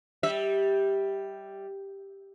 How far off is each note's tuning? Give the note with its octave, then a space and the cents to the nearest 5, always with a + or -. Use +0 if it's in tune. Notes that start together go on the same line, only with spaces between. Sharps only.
G3 +0 E5 -25